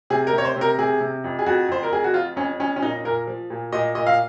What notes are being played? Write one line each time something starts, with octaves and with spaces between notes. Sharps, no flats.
C3 G#4
A#4
C3
C#5
C5
C3
A#4
C3 G#4
C3
F2
G#4
F2 F#4
F2 C5
A#4
F2 G#4
F#4
F3 F4
F2 C#4
F2 C#4
C#4
A#2 D#4
A#2 A#4
F3
A#2
A#2 D#5
A#2 D#5
F5